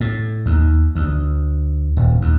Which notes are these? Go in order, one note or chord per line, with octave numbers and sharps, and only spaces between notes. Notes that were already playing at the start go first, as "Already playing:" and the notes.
A2
D#2
D2
D#1
D#2